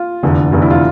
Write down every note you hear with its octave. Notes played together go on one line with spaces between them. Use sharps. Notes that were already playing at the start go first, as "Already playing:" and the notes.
Already playing: F4
F1 E2 D3
F1 E2 D3
E4
F4